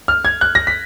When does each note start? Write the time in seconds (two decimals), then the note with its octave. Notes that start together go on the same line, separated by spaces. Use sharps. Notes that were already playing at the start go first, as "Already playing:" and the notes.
0.08 F6
0.25 G#6
0.41 F#6
0.55 A#6
0.67 B6